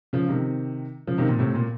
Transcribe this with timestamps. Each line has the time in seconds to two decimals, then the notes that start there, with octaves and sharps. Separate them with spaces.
0.13 C#3 F3
0.29 C3 D#3
1.07 C#3 F3
1.18 C3 D#3
1.29 A#2
1.39 A2 C3
1.55 A#2